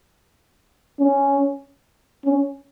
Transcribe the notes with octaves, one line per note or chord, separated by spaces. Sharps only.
C#4
C#4